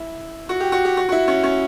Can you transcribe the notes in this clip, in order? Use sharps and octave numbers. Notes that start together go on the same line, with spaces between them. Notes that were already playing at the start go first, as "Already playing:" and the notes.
Already playing: E4
F#4
G4
F#4
G4
F#4
F#4
E4
C#4
C#4